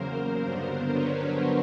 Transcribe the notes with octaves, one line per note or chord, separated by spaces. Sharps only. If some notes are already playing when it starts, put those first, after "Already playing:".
Already playing: E2 C#3 F#3 A#3 A#4 C5
G2 D3 F#3 B3 D4 A#4 C5
B4 C#5